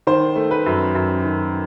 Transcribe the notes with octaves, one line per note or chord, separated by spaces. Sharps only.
D#3 C5
A3
B4
F#2
F#2
D#3